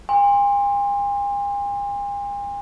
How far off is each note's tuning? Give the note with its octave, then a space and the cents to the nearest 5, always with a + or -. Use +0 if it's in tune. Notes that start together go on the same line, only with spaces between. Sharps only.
G#5 -45 C6 +10